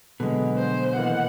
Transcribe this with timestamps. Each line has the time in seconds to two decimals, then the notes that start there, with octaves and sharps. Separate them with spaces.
0.20 B2 D3 F#3 G#3 B3
0.57 B3 C5
0.96 D#3 E3 A#3 F#5